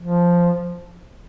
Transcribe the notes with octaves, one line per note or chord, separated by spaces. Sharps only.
F3